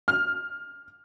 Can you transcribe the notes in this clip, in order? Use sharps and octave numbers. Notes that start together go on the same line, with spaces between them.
F6